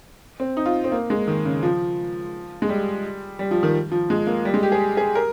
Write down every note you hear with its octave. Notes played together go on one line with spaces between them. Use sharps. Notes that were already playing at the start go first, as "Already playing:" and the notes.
C4
D#4
F4
C4
A#3
G#3
D#3
C#3
F3
G#3
G3
G3
F3
D#3
F3
G#3
A#3
G3
G#3
G4
G#4
G#4
A#4